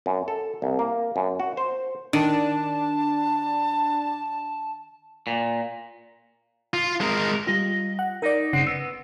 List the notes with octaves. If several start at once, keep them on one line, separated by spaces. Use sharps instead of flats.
F#2
A4
C2
A#3
F#2
F#4
C5
D#3 D4 A5
A#2
F4
G#3 A#4
G3 F4 D#5
F#5
D#4 A#4 D5
G1 C#3 C4 D#4 F#5
B3 E6